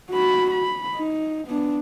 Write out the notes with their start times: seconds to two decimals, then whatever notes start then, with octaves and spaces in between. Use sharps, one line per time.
0.11 F#4 B5
0.51 B5
0.95 D#4
1.48 B3 D4